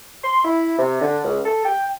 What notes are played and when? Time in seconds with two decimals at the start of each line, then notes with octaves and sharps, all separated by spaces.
0.24 C6
0.45 E4
0.79 C3
1.02 D3
1.24 C#2
1.46 A4
1.66 G5